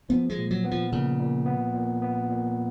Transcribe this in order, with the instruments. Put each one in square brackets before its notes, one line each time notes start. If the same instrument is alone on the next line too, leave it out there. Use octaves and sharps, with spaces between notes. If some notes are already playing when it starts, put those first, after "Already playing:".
[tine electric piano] F3 [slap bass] B3
[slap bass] G#3
[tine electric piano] A#2
[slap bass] F#3
[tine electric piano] B3
[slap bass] F3
[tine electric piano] A#2 [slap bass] C#3
[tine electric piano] A#2
B3
A#2
B3
A#2